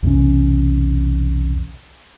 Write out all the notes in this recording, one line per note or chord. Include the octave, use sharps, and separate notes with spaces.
B1 E2 C3 C#4